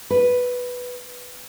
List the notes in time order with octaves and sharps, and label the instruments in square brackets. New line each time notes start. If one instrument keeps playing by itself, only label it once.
[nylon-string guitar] B4